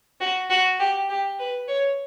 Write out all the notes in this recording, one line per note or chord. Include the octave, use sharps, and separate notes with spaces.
F#4
F#4
G4
G4
B4
C#5